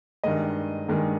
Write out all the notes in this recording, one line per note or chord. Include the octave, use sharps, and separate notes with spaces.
G2 D#3 G#3 D#5
G2 D#3 G#3